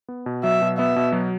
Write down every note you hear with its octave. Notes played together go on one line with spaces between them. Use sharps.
B3
B2
F#3 E5
B2
B3 E5
B2
F#3